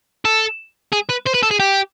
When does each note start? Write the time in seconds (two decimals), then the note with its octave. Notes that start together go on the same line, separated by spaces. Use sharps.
0.25 A4
0.92 G#4
1.09 B4
1.26 C5
1.34 B4
1.43 A4
1.51 G#4
1.60 G4